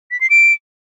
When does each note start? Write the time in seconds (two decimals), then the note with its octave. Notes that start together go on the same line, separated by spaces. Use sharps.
0.11 B6
0.21 C7
0.30 D7